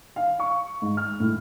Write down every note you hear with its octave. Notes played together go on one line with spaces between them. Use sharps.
F5
C#6
G#2
F6
A2